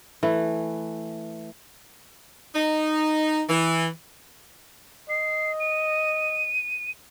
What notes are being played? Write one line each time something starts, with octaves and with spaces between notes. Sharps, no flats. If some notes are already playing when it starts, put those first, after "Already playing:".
E3 A3
D#4
E3
D#5 C7
D#7